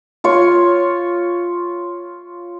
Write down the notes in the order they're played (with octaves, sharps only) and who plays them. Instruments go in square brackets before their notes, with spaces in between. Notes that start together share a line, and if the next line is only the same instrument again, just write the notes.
[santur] F4 C#5